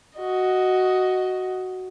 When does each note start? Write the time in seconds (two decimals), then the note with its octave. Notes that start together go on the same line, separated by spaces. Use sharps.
0.18 F#4 D#5